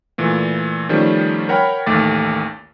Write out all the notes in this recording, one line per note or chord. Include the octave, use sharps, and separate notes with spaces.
A#2 E3 A3
D#3 F3 G3 A3 C#4
A#4 C#5 F#5 G5 B5
A1 D#2 A3 D6 A6